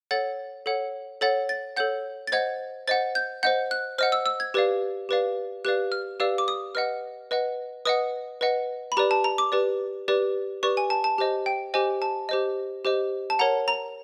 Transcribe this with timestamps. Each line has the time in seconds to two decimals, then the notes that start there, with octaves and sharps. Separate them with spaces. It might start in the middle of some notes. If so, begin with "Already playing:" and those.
0.11 A4 C#5 F#5 A6
0.66 A4 C#5 F#5
1.21 A4 C#5 F#5 A6
1.49 A6
1.77 A4 C#5 F#5 G6
2.27 A6
2.32 C5 D#5 F#5 G#6
2.88 C5 D#5 F#5 A6
3.15 G6
3.43 C5 D#5 F#5 G6
3.71 F#6
3.98 C5 D#5 F#5 F6
4.12 E6
4.26 E6
4.40 G#6
4.54 G4 B4 D5 F5
5.09 G4 B4 D5 F5
5.65 G4 B4 D5 F5 F#6
5.92 F6
6.20 G4 B4 D5 F5 E6
6.38 D6
6.48 D#6
6.75 B4 D#5 F#5 F6
7.31 B4 D#5 F#5
7.85 B4 D#5 F#5 D#6
8.41 B4 D#5 F#5
8.92 B5
8.97 G4 B4 D5 A#5
9.11 A5
9.24 A#5
9.38 D6
9.52 G4 B4 D5
10.08 G4 B4 D5
10.63 G4 B4 D5 C#6
10.77 G#5
10.90 A5
11.04 A5
11.18 G4 C5 D#5
11.46 G5
11.74 G4 C5 D#5 G#5
12.02 A5
12.29 G4 C5 D#5
12.85 G4 C5 D#5
13.30 A5
13.39 A#4 C#5 F#5 A#5
13.68 A#5